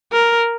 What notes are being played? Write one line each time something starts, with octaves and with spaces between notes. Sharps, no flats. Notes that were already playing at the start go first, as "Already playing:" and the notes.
A#4